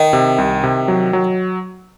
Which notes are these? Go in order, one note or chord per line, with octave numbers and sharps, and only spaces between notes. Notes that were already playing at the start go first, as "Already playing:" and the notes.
Already playing: D#3
C3
C2
C3
F#3
F#3